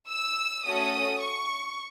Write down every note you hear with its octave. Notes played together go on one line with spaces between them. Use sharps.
E6
A3 C#4 F#4 A4 D#6
C#6